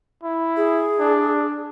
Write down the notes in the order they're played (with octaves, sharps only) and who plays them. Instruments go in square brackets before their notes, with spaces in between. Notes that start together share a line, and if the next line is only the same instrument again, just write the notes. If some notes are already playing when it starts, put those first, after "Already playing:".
[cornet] E4
[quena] G#4
[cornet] D4